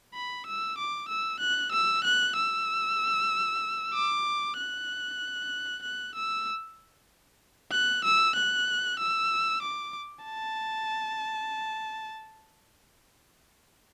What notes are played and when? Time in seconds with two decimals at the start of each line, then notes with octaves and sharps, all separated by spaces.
0.14 B5
0.47 E6
0.78 D6
1.09 E6
1.40 F#6
1.72 E6
2.04 F#6
2.36 E6
3.94 D6
4.57 F#6
5.83 F#6
6.15 E6
7.72 F#6
8.04 E6
8.36 F#6
8.99 E6
9.63 D6
10.25 A5